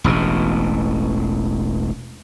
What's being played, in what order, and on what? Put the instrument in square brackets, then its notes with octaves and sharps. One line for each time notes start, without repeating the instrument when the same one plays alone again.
[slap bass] E1 A1 B2